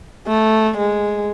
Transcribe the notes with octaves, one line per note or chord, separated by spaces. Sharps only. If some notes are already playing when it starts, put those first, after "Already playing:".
A3
G#3